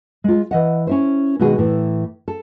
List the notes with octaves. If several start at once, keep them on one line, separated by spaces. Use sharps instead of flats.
G#3 F4
E3 D#5 F#5
C#4 E4 C5
B2 D#3 G#3 F#4 G#4
A2 E3
A4